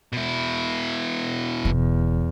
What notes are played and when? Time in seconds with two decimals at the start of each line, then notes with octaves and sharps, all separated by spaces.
0.13 B2 E4
1.65 E1 E2